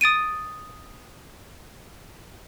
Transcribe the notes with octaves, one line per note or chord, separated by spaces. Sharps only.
D#6 A6 D7 D#7